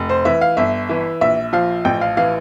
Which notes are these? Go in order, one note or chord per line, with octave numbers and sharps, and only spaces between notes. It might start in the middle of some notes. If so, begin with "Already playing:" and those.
Already playing: F1
C5
E3 E5
F5
G1 E5
E3
A#1 E5
F3 F5
A1 G5
F5
E3 F5